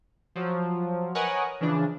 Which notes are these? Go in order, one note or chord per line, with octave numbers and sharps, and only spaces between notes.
F3 F#3
A#4 B4 C#5 D#5 F#5 G#5
C#3 E3 F3 D4